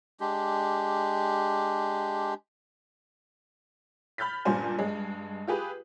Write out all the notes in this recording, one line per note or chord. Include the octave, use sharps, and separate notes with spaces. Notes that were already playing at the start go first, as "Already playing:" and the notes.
G#3 D4 G4
B5 F6 G6 A6 B6
C#2 G2 A#2 G3 C5 G#5
G2 G#3
F4 G4 G#4 B4